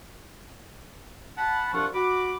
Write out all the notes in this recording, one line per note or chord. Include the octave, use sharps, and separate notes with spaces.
F#5 A5 B5
C2 F3 D4 F4 F#5 C#6
F#4 B5 D6